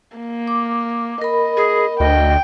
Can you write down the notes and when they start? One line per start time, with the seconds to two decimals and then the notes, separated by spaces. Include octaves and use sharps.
0.17 A#3
0.48 D6
1.22 A#4 D#5 B5
1.57 G#4
2.00 D2 D#5 G5